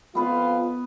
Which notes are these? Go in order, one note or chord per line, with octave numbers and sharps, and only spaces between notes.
F2 B3 F4 B4